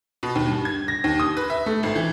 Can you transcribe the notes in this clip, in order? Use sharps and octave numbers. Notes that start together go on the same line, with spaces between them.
B2
D#2
G2
G#6
A#6
D#2
D#6
B4
E5
A3
G#1
E3